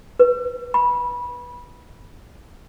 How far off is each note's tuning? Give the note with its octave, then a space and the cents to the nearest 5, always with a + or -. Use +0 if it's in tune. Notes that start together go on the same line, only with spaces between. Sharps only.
B4 -10
B5 -20